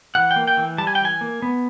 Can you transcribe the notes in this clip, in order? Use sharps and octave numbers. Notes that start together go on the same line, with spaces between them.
E3 F#5
G5
A#3
G5
E3
G3 A5
G#5
G5
E3
G#5
A#3
B3